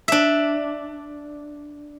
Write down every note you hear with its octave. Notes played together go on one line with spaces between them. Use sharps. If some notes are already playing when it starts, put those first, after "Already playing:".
D4 E5